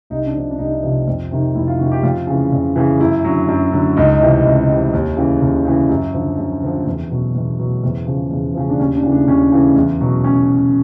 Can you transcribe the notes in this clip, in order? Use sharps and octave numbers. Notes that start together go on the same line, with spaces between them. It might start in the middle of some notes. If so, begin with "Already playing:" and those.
C2 D#4
D4
C3 F3
D4
C2 D#4
C3 F3
F2
C3 D#3
F2 E4
F4
C3 D#3 F#4
G4
F2 F4
C#3 E3
F2
C#3 E3
F#2 E4
D3 F#3
F#2
D3 F#3
C#2 D#4
C3 E3
C#2
C3 E3
D#2
C#3 E3
D#2
C#3 E3
F#2
D3 F3
F#2
D3 F3 C4
E2
B2 F#3
E2
B2 F#3
E2 C4
C#3 F3
E2
C#3 F3
D4
D#2 C#4
D4
C#3 E3
D4
D#2 C#4
C#3 E3
E2
B2 F#3
C#4